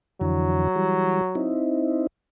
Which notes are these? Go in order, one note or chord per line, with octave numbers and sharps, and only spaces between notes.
F2 D3 E3 F#3
E3 G3
C4 D#4 E4